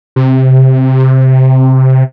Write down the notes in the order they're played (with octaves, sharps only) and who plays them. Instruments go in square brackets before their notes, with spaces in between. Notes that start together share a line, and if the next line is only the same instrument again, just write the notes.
[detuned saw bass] C3